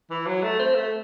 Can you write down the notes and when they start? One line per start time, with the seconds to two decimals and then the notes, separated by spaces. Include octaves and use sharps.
0.10 E3
0.27 F#3
0.43 A3
0.59 C4
0.75 A3